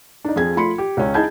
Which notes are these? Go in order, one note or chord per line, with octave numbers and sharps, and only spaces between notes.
D4 D#4
F2 F4 G#4 G#6
F3 A3 B5 C6 C#7
G4
C#2 C#4
D#4 E4 G#4 A5 G6 G#6